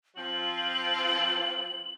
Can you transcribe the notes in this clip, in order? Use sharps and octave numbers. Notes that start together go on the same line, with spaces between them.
F3 C4 F4 F#7